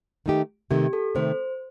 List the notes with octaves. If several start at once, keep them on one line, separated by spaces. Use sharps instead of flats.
D#3 A3 D#4 G4
C3 D#3 A3 G4
A4
C3 D#3 A3 C5